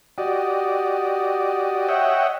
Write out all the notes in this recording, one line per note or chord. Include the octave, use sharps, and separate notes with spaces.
F#4 G4 D5 D#5
C#5 D#5 E5 F#5 G5